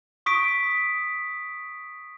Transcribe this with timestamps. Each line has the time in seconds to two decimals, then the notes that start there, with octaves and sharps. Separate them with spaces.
0.26 C#6 D#6 B6 D7